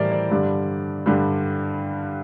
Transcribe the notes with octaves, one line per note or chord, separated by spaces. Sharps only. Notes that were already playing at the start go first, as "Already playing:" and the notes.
Already playing: A2 E3 G3 A#4 C5 D5
D5
G2 D3 G3
G2 D3 G3